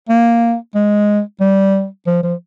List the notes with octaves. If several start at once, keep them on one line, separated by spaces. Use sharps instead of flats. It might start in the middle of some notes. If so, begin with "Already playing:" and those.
A#3
G#3
G3
F3
F3